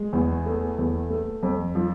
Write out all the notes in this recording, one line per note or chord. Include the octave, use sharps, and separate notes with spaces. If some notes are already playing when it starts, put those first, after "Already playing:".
Already playing: G#3
E2
A3
E2
A3
F2
F3